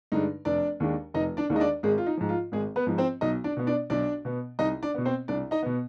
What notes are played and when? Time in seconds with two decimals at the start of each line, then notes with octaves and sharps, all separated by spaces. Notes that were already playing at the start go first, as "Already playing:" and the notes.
0.12 G2 D3 G#3 D4 D#4
0.45 F1 D4 D5
0.80 D#2 D#3 G#3 D4
1.14 F1 D#4 D#5
1.37 D4 D5
1.50 D#2 D#3 G#3 D4
1.56 D#5
1.60 D4 D5
1.83 G#1 G#3 G#4
1.98 F4
2.06 D#4
2.17 G#2 F3
2.29 F4
2.52 G#1 G#3 G#4
2.76 B3 B4
2.87 G#2 F3
2.98 C4 C5
3.21 B1 D#4 D#5
3.44 D4 D5
3.57 B2 B3
3.67 D4 D5
3.90 B1 D4 D5
4.25 B2 B3
4.59 C2 D#4 D#5
4.83 D4 D5
4.94 B2 B3
5.05 C4 C5
5.28 C2 D4 D5
5.51 D#4 D#5
5.63 B2 B3